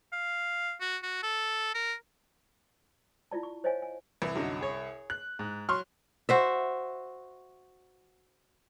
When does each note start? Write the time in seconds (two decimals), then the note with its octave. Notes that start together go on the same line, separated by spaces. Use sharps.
0.13 F5
0.81 F#4
1.03 F#4
1.23 A4
1.74 A#4
3.31 E4 F4 D5 A5
3.43 C#6
3.64 C5 C#5 D#5 F5 G#5
3.82 G#5
4.22 C2 E3
4.35 F#2 D3 D#4
4.61 G#4 C#5
5.10 F#6
5.39 G#2
5.69 F#3 C6 C#6 F6
6.29 F#4 C5 E5